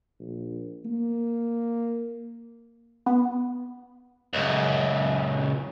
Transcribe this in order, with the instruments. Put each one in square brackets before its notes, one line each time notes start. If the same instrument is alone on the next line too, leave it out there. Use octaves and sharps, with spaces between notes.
[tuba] A#1
A#3
[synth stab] B3
[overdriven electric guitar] C#2 F#2